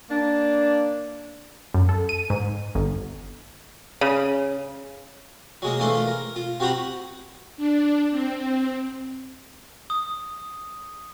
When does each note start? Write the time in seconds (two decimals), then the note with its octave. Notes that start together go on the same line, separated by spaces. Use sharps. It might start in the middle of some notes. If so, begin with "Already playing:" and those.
0.10 A#3 D4
1.74 F#2
1.89 A4
2.09 D#7
2.30 G#2
2.75 G1
4.01 C#3
5.62 F#3 G#3 A#3
5.80 E3 A3 A#3 D4 A4 C5
5.96 F4
6.07 A#4
6.36 F4
6.60 C4 F#4 G4 A#5 B5
7.57 D4
8.11 C4
9.90 D#6